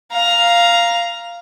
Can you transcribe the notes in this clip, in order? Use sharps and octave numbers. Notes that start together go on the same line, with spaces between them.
F5 A#5